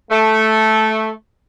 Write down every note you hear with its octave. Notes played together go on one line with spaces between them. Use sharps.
A3